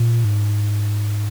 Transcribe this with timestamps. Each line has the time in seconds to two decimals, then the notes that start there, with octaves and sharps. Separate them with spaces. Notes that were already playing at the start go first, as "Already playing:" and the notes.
Already playing: A#2
0.24 G#2